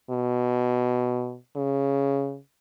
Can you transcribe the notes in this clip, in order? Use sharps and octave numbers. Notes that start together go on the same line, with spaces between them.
B2
C#3